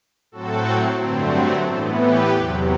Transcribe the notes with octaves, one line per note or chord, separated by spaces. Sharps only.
A2 F#3 C4 F#4 A4
G2 D3 F#3 A3 C4
A2 E3 B3 A4 C5
G4 B4
E2 C3 F#3